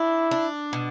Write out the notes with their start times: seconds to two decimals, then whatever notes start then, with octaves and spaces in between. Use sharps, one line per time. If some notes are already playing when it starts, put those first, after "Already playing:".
Already playing: D4 E4
0.31 D4
0.73 B2